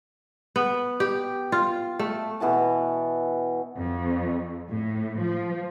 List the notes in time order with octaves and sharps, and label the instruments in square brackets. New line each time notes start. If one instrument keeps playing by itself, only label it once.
[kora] B3
G4
F4
A3
[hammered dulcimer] B2 E3 F#4 A5
[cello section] F2
A2
F3